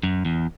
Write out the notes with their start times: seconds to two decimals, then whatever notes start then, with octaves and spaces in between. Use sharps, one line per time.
0.03 F#2
0.25 E2